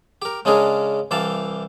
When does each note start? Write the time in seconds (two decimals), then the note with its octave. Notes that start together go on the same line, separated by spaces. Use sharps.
0.22 G4 A#4
0.45 C#3 G#3 C#4 D4 G#4 A#4
1.11 C2 E3 G4 F5 A5